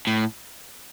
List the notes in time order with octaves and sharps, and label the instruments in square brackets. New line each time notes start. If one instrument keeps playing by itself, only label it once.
[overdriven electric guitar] A2